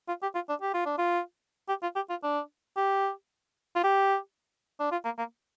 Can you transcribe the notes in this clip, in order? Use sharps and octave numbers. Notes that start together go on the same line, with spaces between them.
F4
G4
F4
D4
G4
F4
D4
F4
G4
F4
G4
F4
D4
G4
F4
G4
D4
F4
A#3
A#3